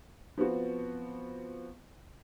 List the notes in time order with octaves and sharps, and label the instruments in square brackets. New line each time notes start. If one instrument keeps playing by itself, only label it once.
[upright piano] F3 B3 C4 F#4